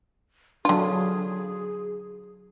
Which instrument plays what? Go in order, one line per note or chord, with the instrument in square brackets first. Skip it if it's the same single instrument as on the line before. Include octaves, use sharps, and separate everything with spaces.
[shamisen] D3 F4 [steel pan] F#3 D4 [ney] G#4